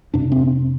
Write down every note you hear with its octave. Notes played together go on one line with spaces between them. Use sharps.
F2 C3 D4
C4